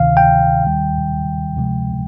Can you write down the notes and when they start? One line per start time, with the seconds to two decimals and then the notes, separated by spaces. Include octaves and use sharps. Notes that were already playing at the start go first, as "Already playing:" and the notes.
Already playing: D2 C3 D#3 F5
0.17 G5
0.63 D#2 D#3 G3
1.56 D2 C3 F3 G#3